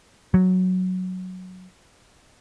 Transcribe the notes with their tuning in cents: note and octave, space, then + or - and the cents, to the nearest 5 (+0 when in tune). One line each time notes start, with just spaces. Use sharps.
F#3 -5